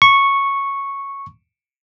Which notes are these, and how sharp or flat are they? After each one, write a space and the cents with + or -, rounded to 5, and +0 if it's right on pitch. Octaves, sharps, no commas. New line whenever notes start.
C#6 -5